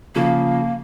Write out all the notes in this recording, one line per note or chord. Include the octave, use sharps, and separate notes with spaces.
C#3 F3 A#3